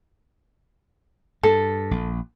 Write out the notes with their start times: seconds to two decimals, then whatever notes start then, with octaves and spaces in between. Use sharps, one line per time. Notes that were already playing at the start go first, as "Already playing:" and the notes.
1.43 G2 A4
1.91 A#1